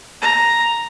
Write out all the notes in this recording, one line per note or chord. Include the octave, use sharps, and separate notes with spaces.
A#5